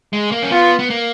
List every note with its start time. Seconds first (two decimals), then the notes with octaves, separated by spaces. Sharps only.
0.13 G#3
0.32 A#3
0.42 C#4
0.51 B3 F4
0.79 B3
0.90 A#3